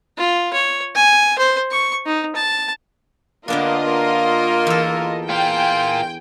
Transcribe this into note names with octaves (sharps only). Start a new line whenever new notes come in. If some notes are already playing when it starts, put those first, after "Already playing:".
F4
C#5
G#5
C5
C#6
D#4
A5
D3 A#3 B3 D4 F4 A#4 D#5
A#3
E2 A4
F4 A#4 G5 G#5